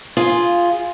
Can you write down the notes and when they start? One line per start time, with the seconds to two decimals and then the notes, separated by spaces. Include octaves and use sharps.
0.17 F4 G#4